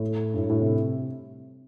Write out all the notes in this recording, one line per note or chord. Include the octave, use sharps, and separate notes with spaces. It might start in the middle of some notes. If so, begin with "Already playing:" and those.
Already playing: A2
G2
A2
A2
C3